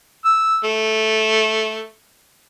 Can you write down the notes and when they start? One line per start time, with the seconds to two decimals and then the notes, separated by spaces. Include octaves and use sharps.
0.25 E6
0.64 A3